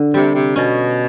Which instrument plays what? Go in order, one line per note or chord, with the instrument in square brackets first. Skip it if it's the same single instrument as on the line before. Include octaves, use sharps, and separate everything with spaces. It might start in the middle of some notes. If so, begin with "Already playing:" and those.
Already playing: [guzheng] D3
[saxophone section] C3 [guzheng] G3
[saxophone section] C3
[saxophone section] B2 [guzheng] C#4